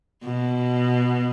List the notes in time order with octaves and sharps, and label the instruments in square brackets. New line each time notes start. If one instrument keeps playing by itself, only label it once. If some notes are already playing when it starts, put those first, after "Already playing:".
[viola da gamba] B2